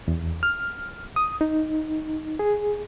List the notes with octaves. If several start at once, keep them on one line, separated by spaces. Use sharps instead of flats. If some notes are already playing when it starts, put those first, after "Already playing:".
E2
F6
D#6
D#4
G#4